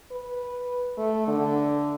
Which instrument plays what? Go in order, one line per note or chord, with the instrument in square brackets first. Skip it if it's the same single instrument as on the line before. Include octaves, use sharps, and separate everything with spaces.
[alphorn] B4
A3
D3